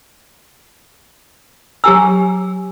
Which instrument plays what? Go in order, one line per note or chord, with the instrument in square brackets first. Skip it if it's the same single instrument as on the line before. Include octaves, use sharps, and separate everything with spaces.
[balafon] F#3 A#5 [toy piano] G4 G#5 E6